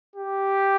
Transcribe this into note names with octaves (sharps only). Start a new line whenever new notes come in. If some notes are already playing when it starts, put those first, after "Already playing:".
G4